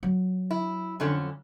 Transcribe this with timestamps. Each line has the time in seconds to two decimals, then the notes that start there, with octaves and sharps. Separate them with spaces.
0.03 F#3
0.51 E4
1.00 F2 D3 C#4